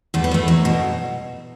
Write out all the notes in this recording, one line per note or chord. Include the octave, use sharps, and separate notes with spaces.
E2 A3
B3
E2 A3
F#3
B2